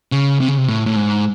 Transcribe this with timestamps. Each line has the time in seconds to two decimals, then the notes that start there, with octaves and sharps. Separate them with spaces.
0.12 C#3
0.40 C3
0.48 C#3
0.58 C3
0.68 A2
0.86 A2
0.96 G#2